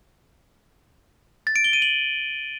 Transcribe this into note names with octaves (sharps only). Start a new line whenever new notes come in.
A6
D7
G7
D#7
F#7